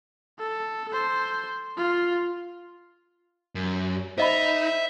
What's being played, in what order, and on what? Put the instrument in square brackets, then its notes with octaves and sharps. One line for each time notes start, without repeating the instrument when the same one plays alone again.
[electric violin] A4
A4 C5
F4
[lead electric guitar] F#2
[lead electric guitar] D#4 [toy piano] C5 D#5 B5 [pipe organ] E5